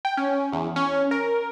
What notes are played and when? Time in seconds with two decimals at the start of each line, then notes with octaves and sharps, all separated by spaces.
0.05 G5
0.17 C#4
0.53 E2
0.76 C#4
1.11 A#4